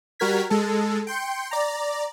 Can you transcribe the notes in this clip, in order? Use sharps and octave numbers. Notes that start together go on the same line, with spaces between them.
G3 F#4 A#4 F6 G#6 B6
G#3 A4
G5 C6 G6 C#7
D5 A#5